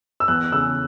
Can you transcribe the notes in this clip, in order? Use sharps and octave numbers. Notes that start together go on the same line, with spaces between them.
E6
E2 F#6
C#3 E6